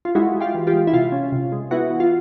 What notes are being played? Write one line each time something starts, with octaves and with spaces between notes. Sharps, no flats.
F4
G#3 E4 F#4
G#3
F4 G4
E3
F4 G4
G#3
E4
C3 F4
C#4
C3
G#3
B3 E4 F#4
E3
F4